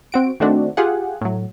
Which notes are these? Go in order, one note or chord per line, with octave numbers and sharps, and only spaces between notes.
C4 F#4 D7
D#3 A3 C4 D4 F#4
F4 G4 G#4 F#5
A2 F#3